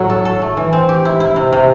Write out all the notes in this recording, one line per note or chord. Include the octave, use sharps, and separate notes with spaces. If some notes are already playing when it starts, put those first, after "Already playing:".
Already playing: A2 F#3
A4
A4
A3
E3
C4
G4
E4
E4
C3
C3